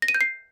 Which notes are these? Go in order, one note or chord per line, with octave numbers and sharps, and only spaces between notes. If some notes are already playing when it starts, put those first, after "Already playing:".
A#6
D#7
G6
C7